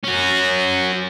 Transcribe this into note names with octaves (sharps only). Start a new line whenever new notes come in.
C#4 F#4